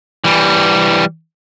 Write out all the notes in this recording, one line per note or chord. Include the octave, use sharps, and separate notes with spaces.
E3 G3